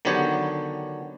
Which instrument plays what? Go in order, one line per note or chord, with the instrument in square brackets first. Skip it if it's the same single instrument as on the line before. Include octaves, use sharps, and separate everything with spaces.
[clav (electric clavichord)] D3 D#3 F#3 B3 G4 C#5